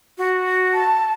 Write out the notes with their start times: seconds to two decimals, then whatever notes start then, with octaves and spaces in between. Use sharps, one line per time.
0.18 F#4
0.74 A5